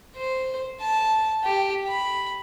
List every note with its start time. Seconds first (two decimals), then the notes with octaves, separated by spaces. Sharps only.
0.17 C5
0.81 A5
1.44 G4
1.88 B5